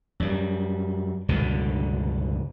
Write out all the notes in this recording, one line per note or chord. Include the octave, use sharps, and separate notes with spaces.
F#2 G3
C#2 G2 B2 D3